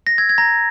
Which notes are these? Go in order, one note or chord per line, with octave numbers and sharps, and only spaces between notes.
A#6
E6 G#6
G#6
A#5 A#6